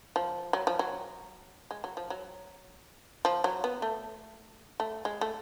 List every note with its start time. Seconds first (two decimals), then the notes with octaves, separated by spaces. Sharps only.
0.16 F3
0.53 F#3
0.67 F3
0.79 F#3
1.71 G#3
1.84 F#3
1.97 F3
2.10 F#3
3.25 F3
3.44 F#3
3.64 B3
3.82 A3
4.80 A3
5.05 G#3
5.21 A3